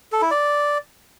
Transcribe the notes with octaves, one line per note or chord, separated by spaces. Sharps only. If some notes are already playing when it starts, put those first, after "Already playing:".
A4
E4
D5